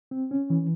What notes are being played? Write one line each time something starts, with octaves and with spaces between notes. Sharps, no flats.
C4
C#4
E3